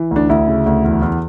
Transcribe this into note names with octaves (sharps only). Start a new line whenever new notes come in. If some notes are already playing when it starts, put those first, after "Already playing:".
Already playing: E3
D2 D4
D2 E4
C#3
D2
E2
E2